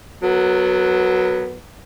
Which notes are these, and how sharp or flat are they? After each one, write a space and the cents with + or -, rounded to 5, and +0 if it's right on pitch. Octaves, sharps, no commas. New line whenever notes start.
F#3 +0 B3 +0 A#4 -45